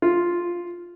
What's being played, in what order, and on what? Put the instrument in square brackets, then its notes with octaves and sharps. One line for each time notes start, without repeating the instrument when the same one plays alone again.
[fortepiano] F4